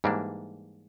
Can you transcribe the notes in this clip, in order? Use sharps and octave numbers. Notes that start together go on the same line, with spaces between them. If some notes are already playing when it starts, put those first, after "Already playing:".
G#2 E3 G3 A#3 D4